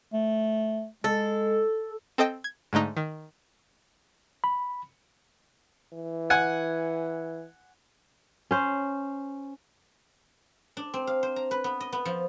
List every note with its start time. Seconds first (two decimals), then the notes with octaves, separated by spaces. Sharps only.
0.13 A3
1.04 G#3 A4
2.18 C4 A4 D#5 G5
2.44 G#6
2.73 G#2 D3 A3 D#4
2.97 D#3
4.44 B5
5.93 E3
6.30 F#5 G#5
8.51 C#4 C5
10.77 D4
10.94 C4
11.07 F5
11.23 C5
11.36 A#5
11.51 B4
11.64 B3
11.80 D#5
11.93 B3
12.05 F3